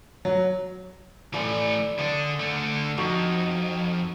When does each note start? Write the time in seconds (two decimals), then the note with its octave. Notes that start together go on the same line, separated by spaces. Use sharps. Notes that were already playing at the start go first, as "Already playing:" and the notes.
0.25 F#3
1.34 E3 A3 D5 G#5 C6
1.99 D3 D4 D#6
2.39 D3 A3
2.97 F2 D#4 F#4 D#5